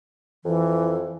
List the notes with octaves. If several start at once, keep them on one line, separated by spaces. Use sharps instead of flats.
F2 E3